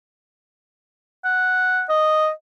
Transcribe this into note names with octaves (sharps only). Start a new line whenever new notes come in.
F#5
D#5